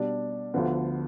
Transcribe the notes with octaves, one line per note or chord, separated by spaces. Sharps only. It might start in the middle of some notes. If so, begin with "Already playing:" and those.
Already playing: B2 G3 D4 A5
D2 D3 F3 B3